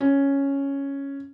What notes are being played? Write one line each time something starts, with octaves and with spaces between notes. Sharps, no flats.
C#4